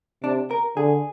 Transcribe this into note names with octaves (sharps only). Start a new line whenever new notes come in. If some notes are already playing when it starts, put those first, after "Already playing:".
C3 D4
A#4
D3 G#4